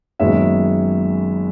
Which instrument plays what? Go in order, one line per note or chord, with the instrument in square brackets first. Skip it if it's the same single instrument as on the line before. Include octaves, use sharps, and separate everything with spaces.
[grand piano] F#1 F#2 D#3 G#3 B3 C#5 E5